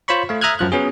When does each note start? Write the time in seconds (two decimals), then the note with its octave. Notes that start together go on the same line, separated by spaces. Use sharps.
0.08 F4 C5 C#5 B5 C#6
0.29 A3 F5
0.41 E5 A#5 D#6 F6 F#6 G#6
0.59 F#2 F3 F#6
0.72 B3 C#4 F#4 G#4